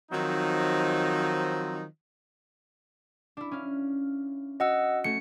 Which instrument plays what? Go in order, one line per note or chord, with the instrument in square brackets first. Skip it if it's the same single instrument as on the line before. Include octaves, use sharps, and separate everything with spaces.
[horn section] D#3 F3 F#3 C4 D#4
[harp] D4 E4
C#4 F5
[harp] F#4 [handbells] D#5 F#5 E6
[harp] A3 C#4 F#4 [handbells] C#7